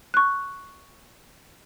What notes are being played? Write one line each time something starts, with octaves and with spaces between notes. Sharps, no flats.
C#6 F#6